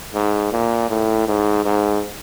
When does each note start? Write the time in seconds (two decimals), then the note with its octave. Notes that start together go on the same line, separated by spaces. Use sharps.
0.14 G#2
0.52 A#2
0.90 A2
1.28 G#2
1.65 G#2